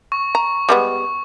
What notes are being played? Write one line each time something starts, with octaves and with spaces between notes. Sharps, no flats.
C#6
A#5
G3 G#3 B3